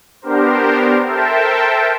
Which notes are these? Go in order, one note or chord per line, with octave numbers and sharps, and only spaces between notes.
B3 D4 G4 A#4 C5
A4 A#4 C5 E5 G5 A5